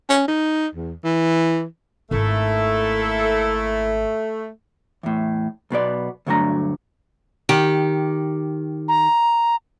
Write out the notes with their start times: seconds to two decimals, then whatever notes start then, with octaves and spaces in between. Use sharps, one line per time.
0.09 C#4
0.28 D#4
0.75 E2
1.04 E3
2.11 G#1 A3 A#3 D#4 E4 A4
5.03 E2 A2
5.70 B1 B2 B3 D5
6.27 D2 G2 F#3 A3 D4 A#5
7.49 D#3 G4
8.88 A#5